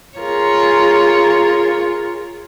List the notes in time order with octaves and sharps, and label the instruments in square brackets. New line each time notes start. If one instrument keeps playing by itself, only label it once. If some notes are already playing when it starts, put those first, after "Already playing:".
[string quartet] F4 G#4 A#4 C#5